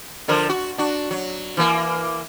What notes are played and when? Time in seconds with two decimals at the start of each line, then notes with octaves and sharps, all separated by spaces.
0.28 D3 F3 A#4
0.49 F#4
0.78 D4 F#4
1.11 F#3
1.57 E3 A#3